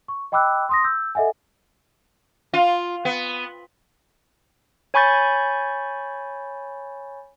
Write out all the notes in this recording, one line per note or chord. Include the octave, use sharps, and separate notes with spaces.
C#6
D#5 G5 B5 D6 E6 F#6
C6 D#6 A#6
E6 G6
A4 D#5 E5 F#5 G#5
F4
B3
C#5 G#5 B5 C#6 G6 A6